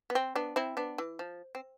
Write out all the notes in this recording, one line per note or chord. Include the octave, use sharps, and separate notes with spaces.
B3
C4
B3 D4
C4 E4
B3 D4
E3
F3
C4